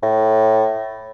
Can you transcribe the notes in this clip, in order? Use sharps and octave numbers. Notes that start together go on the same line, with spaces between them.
A2